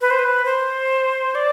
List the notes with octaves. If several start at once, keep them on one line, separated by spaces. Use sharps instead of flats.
B4
C5
B4
C5
D5